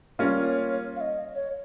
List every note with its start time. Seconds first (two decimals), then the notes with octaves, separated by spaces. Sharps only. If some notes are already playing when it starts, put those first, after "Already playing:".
0.19 G3 A#3 C#4 F4 C#5
0.96 F5
1.01 D#5
1.35 C#5